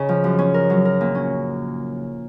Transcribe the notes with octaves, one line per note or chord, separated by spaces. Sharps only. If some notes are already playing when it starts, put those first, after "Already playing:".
Already playing: C#3 D#4 G#4
F3
F#2
C#4
A#4
F#3
A#4
A#2
C#4